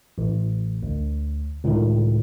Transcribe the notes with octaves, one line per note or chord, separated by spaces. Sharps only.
A1
D2
C#2 A2 D#3